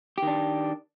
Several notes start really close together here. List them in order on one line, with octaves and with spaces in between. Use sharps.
G4 D#3 D4